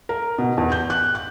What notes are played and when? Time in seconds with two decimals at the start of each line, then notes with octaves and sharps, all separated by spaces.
0.09 A#4
0.38 B2
0.57 E2
0.72 G6
0.90 F#6
1.15 F#6